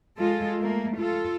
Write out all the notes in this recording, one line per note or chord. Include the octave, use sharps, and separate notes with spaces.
G#3 F4 A4
A3 A#3
F4 A4